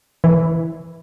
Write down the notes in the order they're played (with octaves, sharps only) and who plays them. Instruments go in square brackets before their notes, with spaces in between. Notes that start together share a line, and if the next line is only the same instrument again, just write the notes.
[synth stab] E3